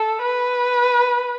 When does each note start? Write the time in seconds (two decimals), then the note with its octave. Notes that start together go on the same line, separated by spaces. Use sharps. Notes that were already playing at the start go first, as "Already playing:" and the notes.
Already playing: A4
0.23 B4